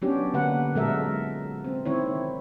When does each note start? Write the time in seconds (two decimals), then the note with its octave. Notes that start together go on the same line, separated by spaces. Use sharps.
0.02 F#3 B3 C#4 D4 G4
0.34 D3 A#3 B4 F#5
0.75 A#2 F#3 G#3 A4 A#4 E5
1.64 C4
1.86 D#3 C4 E4 C#5